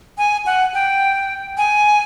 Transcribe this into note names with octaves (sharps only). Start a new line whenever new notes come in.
G#5
F#5
G5
G#5